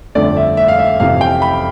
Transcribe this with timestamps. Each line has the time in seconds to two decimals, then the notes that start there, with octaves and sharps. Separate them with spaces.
0.15 G1 F2 D3 A3 D5
0.37 E5
0.57 E5
0.68 F5
0.79 E5
1.00 F2 C3 E3 F5
1.21 G5
1.42 B5